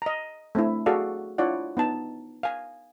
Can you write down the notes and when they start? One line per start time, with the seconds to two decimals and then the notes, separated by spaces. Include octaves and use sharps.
0.02 D#5 A#5
0.55 A3 C4 D4 E4
0.86 F#4 G#4 A4 D5 F5
1.38 D4 E4 F4 C#5 D5 F#5
1.77 B3 D#4 A5
2.43 F5 G#5